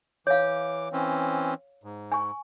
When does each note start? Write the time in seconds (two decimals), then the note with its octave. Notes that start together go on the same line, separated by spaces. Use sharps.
0.27 E3 C#5 F5 D6
0.93 E3 C4 C#4
1.83 G#2
2.12 G#5 C#6